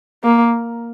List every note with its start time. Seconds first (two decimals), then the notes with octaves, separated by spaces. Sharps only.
0.24 A#3